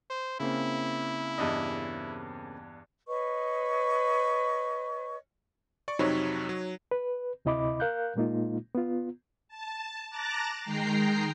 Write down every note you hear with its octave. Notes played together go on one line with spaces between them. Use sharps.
C5
C#3 A#3 C4 E4
E2 G2 D#5
B4 C#5 D#5 C#6
D5 C#6
F2 C3 F#3 D#4 C#5
F#3
B4
D2 C3 E4 D#5 B5 D6
A#4 F5 F#6 G6
A#2 G#3 A#3 D#4 F4
B3 F4
A5
A5 A#5 D6 F#6 A6 A#6
D#3 G#3 G5 A#5 C7